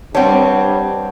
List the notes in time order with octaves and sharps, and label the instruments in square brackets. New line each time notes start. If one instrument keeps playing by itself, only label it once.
[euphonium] G2 [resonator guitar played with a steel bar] G3 C4 [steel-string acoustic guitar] C#5 [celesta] F#5 A5